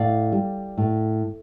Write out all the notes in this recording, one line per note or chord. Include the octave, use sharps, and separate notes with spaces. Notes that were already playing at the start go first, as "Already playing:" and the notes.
Already playing: A2 D5 F5
G3
A2